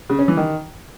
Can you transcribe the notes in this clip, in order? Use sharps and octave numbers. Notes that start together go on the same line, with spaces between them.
C#3
C#4
E3
D#3